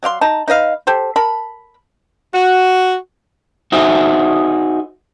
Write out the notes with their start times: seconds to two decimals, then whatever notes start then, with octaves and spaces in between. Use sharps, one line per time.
0.03 F#3 D5 F5 C6
0.21 D#4 A5 A#5
0.48 D#4 B4 D#5 F5
0.87 G4 A4 C5
1.16 A#4 A5 B5
2.35 F#4
3.72 D#4 F#4 G#4 C5 E5